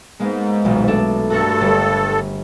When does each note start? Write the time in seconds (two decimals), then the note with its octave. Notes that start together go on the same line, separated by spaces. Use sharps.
0.20 G#2 G#3 A#3 B3
0.65 D#1 B1
0.88 A3 D4 A4
1.30 G2 F#4 A4 A#4 C#6
1.61 G1